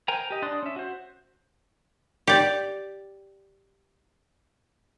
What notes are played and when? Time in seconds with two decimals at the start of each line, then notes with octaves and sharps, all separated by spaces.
0.08 A#4 C5 G5 G#5 A#5
0.31 G4 D#5
0.42 D4 D5 C6 D#6 F#6
0.63 C#4 E5
0.76 F#4 C5
2.27 G4 D5